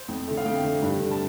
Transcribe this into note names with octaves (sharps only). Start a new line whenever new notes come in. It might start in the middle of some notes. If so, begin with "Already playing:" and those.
Already playing: C5
F2
D3 A3
F5
F2 G5
D3 A3
G2
D3 A3
A5